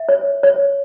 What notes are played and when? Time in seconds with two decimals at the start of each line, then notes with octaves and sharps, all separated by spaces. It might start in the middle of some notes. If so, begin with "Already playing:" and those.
Already playing: E5
0.09 C#5
0.43 C#5